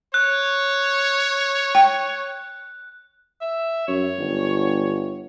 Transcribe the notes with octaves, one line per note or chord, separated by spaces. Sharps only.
C#5 F#6
G5
E5
F#2 C#5
G1